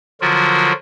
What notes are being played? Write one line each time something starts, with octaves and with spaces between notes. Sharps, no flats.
D3 F3 F#3 F4 F#4 A#4